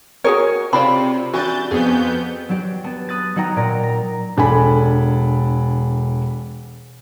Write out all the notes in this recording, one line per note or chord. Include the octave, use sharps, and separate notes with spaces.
F#4 G#4 A#4 C#5
C3 C4 F4 D5 B5
E3 D4 F#4 G6 A6
F2 B3 G#4 G6
F#3 D4 G4
B3 A5
B5 D#6 F#6 A6
F#3 D#4 F#5 G5 A#5 D#6
A#2 D5 A#5
A#5
E1 D4 A4 G#5 B5